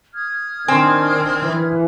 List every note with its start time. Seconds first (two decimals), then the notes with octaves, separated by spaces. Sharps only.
0.14 D#6 F6 G#6
0.68 D#3 C4 D4 G#5 C6
1.41 E3